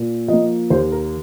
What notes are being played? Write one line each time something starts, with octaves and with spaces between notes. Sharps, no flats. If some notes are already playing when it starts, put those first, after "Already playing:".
Already playing: A#2
F3 A#3 D#5
D#2 C5
A#4